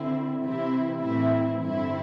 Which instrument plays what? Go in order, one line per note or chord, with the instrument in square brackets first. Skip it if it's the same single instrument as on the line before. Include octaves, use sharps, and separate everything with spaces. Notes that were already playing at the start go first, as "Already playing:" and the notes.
Already playing: [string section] D3 C4 E4
C3 E3 C4 E4
A2 E3 C4 E4
G2 D3 C4 E4